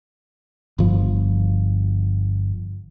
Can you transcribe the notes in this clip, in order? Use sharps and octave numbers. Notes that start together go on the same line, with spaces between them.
G1 F3